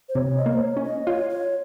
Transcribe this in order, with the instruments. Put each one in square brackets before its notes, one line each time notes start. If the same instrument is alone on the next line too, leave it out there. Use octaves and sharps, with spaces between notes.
[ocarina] C5
[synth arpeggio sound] C3 [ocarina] C#5
[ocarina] D#5
[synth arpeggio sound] A#3
[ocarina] C5
C#5
[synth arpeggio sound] C#4
[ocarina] D#5
[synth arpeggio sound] F4 [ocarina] C#5
[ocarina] C#5